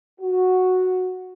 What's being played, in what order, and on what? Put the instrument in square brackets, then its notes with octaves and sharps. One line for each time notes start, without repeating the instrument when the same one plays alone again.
[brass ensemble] F#4